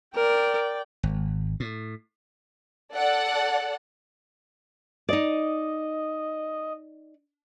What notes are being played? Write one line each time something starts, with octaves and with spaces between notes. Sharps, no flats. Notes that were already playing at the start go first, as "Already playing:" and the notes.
A#4 D5 G5
G#1
A2
A4 D5 F#5
D#4 D5 D#5